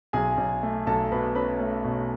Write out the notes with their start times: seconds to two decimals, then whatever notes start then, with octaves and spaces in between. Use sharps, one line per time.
0.13 B1 G#4 G#5
0.38 B1
0.63 A3
0.87 B1 A4 A5
1.12 B2 B4 B5
1.35 C#4 B4 B5
1.60 A3
1.84 B2